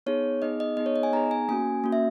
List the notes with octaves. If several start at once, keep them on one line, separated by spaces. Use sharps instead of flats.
B3 D#4 G#4 C#5
B3 D#4 G#4 D#5
D#5
B3 D#4 G#4 D#5
C#5
D#5
G#5
B3 D#4 G#4 A#5
G#5
A#3 C#4 F#4 G#5
A#3 C#4 F#4
E5